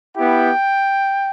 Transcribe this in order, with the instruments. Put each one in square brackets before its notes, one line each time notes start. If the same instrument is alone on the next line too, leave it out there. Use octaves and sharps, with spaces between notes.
[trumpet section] B3 E4 G4 G5